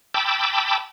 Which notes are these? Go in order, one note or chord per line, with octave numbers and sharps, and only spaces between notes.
G5 A5 B5 D6 E6